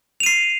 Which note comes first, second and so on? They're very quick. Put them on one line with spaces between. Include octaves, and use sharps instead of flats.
F7 D#7 C7